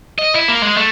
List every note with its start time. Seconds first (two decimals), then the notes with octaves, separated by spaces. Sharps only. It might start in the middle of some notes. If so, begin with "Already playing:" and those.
0.19 D#5
0.35 E4
0.48 A#3
0.63 G#3
0.77 A3